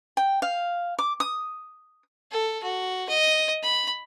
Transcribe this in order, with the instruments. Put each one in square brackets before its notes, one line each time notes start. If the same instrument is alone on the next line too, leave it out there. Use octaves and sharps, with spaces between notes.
[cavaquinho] G5
F5
D6
D#6
[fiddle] A4
F#4
D#5
B5